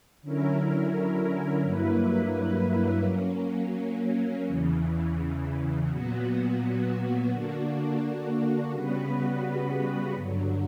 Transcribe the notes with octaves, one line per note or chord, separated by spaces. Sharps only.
D3 F#3 C#4 E4 A#4
G2 F#3 A#3 E4 B4
F#3 A#3 C#4
E2 C#3 E3
A#2 F#3 B3 F#4
D3 A#3 D4 F#4
C#3 G3 B3 F#4 B4
G2 D3 F#3